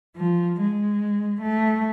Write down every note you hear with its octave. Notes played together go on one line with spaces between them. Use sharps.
F3
G#3
A3